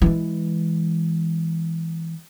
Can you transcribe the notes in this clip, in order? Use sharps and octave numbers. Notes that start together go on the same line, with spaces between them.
E3 G#3